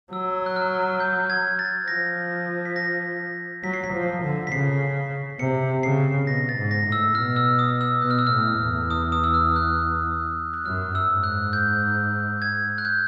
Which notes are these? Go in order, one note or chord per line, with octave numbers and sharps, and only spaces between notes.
F#3 E6
F#6
F6
G6
G#6
A6
F3 A#6
B6
A#6
F#3 B6
C7
B6
F3
D3
B6
C#3 C7
C3 C#7
C#3 C7
B2 A#6
A6
G#2
A#6
A2
E6
B2 F6
E6
D#6
E6
B2 F#6
F6
E6
A2 F6
E2
D#6
D#6
E6
F6
F#6
F#6
F#2 F6
E6
G#2
F#6
G6
G#6
F#6
G6